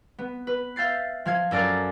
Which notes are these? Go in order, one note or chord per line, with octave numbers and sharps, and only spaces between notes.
B3
B4
E5 F5 G6 A6 C7
F3 F5 G#6
F#2 A4 A#4 D5 F5 A6